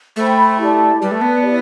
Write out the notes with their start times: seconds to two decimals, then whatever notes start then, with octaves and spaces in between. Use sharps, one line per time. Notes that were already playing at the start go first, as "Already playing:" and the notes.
0.16 A3 C5 G5 B5
0.58 E4 G4 D5 A5
1.00 G3 B4 D5 A5
1.11 A3
1.21 B3
1.42 E4 G4 D5